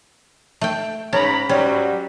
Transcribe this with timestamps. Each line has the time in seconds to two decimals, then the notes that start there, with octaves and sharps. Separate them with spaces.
0.61 A3 G5
1.13 G#2 C#4 A#5 B5
1.49 G#2 F#3 G3 C#4